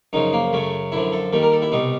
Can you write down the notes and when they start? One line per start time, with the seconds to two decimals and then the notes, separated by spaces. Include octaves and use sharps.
0.13 F#2 C#3 F3 D#4
0.33 A#3
0.53 F#2 C#3 F#3 A3
0.92 F#2 D3 F3 E4
1.12 A4
1.32 D#2 D#3 G3 A4
1.43 A#4
1.52 A4
1.62 E4
1.72 C2 B2 G3 D#4